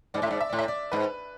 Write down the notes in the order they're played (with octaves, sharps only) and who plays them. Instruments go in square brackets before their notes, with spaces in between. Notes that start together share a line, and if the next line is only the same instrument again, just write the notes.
[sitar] G#2 [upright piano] D5
[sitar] A2 [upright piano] E5
[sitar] G#2 [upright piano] D5
[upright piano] E5
[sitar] A2 [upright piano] D5
[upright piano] E5
D5
[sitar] G#2 [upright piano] B4